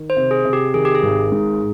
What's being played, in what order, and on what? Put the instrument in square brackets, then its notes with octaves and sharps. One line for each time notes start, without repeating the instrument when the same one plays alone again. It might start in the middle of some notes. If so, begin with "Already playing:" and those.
Already playing: [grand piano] D#3
[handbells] C5
[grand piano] C3
[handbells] G#4
[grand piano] C3
[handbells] G4
[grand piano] D#3 [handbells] G#4
[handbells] G4
G#4
[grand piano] G#1
G#2